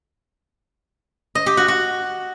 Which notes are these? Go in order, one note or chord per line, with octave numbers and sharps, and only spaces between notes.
D#5
G4
F#4
F#4